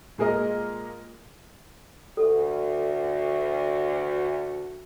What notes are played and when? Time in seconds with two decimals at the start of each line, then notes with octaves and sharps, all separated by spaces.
0.18 A#2 G#3 G#4 A#4 D#5
2.17 D2 F#4 A4